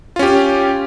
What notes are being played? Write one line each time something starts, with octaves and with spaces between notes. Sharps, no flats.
C#4 F4 G4